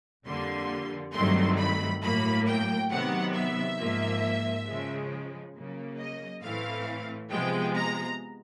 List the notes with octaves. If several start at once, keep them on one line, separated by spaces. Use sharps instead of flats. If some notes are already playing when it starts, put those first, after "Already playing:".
F2 D3 G3 A#3 C6
G2 D#3 F#3 A3 C4 C6
B5
A2 F#3 A#3 B5
G5
C3 D#3 F#3 B3 F#5
E5
G#2 F3 A#3
C#3 F3 G#3
C#3 F#3 A#3
D#5
A2 E3 A3 C4 F5
C3 F3 G#3 B3 G5
A#5